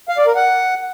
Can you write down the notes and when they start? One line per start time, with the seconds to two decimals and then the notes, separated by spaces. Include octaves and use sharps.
0.09 F5
0.18 D5
0.26 A#4
0.35 F#5